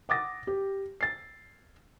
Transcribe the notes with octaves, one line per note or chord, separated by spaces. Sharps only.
F#5 D6 D#6 A6 A#6
G4
A6 C7